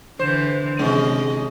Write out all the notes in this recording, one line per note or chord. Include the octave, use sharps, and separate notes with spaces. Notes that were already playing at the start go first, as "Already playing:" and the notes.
D3 E3 C5
C3 D#3 G#3 C#4 D#5